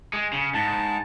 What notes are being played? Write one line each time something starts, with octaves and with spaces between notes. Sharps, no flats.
G#3
C#3
G#2 A5